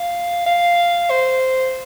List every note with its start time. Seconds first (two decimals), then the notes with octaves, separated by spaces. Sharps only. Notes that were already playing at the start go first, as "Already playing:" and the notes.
Already playing: F5
0.46 F5
1.10 C5